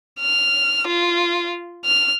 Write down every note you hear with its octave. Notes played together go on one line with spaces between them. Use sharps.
F6
F4
F6